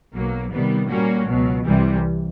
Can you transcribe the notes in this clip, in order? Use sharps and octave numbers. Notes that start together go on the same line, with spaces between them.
B1 B2 F#3 A#3
C3 D#3 G3 B3
A#2 G3 A#3 C#4 F#4
C#2 B2 F#3
C2 C3 E3 G3